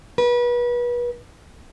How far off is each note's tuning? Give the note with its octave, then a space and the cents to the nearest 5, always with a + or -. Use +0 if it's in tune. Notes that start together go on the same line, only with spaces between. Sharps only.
B4 -35